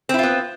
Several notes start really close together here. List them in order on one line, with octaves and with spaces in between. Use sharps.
C4 E4 F4 B3